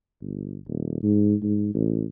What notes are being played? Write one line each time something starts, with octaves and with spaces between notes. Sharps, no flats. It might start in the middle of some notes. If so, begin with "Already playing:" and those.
G1
D#1
G#2
G#2
A1